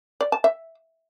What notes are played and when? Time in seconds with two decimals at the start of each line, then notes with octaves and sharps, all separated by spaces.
0.21 D5
0.32 A5
0.44 E5